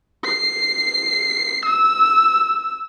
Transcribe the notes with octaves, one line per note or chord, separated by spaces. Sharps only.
C7
E6